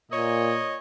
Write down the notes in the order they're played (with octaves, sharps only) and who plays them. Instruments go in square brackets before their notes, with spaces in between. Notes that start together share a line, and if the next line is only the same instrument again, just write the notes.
[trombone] A#2 [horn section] A#3 C#5 D#5